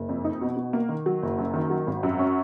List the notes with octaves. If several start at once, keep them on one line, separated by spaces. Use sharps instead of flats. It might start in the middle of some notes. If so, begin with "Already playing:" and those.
Already playing: F#1
F2
D#4
B2
B2
A#3
D#3
F#3
F#1
F#2
D#3
F#3
G#1
F#2
C#4